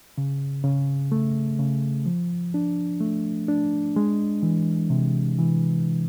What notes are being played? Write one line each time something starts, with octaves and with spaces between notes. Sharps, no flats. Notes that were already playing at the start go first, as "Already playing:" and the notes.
C#3
C#3
A3
C#3
F3
D4
A3
D4
G#3
E3
C3
E3